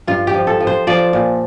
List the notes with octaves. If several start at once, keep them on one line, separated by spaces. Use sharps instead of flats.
G2 F4
G4
F3
A4
F3
C5
F3 D5
A#2